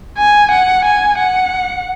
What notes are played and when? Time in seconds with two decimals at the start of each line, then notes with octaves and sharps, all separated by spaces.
0.17 G#5
0.51 F#5
0.85 G#5
1.18 F#5